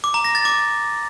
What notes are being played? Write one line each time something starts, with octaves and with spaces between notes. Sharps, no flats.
D6
A#5
A#6
A6
D6